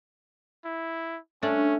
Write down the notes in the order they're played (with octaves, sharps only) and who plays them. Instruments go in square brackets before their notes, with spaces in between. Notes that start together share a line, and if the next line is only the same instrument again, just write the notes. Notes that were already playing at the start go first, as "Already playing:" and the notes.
[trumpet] E4
[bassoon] A3 [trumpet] C#4 [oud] D4